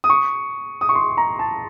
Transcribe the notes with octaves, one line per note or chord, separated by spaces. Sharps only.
D#6
C#6
D#6
C#6
C6
A#5
A5